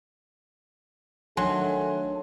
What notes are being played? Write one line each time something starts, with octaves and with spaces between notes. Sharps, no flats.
D#3 F#3 A3 D4 A4 G#5 C6